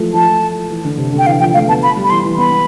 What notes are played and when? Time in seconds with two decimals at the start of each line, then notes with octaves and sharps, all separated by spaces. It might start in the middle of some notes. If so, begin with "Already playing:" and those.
Already playing: E3 F3 A3
0.14 F3 A5
0.70 E3
0.85 D3
0.98 C3
1.12 D3
1.19 G5
1.26 E3 F5
1.40 F3 G5
1.54 A3 F5
1.67 B3 A5
1.83 B5
1.96 G3
2.04 B5
2.10 E3 C6
2.24 E3
2.38 B3 B5
2.52 B3